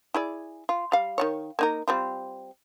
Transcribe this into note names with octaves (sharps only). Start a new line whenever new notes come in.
E4 G#4 D5
F4
G3 F5
D#3 G3 C#5
A#3 D#4 A#4
G3 C4 F4